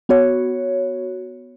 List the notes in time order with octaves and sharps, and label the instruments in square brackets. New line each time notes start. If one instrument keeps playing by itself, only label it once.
[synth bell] B3 F#4 C#5